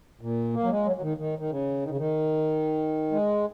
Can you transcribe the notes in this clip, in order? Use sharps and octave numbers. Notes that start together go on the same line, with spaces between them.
A#2
A#3
F#3
G#3
F#3
F#3
D#3
D#3
D#3
C#3
D#3
C#3
D#3
G#3